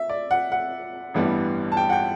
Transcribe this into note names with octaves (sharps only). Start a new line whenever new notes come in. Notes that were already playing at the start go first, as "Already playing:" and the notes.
Already playing: E5
D5
F#5
F#5
A1 G2 E3 G3 B3
A5
G5
F#5
G5